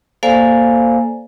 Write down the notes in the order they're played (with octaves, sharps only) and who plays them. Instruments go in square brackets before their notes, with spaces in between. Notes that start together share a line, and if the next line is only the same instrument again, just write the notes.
[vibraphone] A#3 A4 C5 D5 F5 G#5